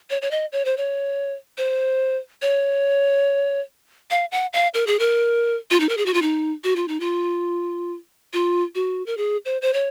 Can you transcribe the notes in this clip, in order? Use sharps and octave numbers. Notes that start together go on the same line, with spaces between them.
C#5
C#5
D#5
C#5
C5
C#5
C5
C#5
F5
F#5
F5
A#4
G#4
A#4
F4
D#4
A#4
G#4
F#4
F4
D#4
F#4
F4
D#4
F4
F4
F#4
A#4
G#4
C5
C5
C#5